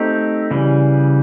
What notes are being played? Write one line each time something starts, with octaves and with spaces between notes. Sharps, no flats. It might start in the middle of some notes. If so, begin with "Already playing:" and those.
Already playing: A3 C4 D#4 G4
C#3 E3 G3